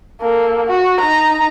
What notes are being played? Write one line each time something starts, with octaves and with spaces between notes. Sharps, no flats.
A#3 A4
F#4
D#4 A#5